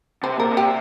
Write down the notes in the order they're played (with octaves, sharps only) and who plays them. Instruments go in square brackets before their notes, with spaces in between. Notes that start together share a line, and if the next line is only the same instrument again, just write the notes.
[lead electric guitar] C3 [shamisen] C5
[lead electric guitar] A#2 [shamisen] A#4
[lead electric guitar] C3
[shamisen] G4